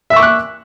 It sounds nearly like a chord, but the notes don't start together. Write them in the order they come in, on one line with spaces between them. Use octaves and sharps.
E5 E6 C#6 D6 F#6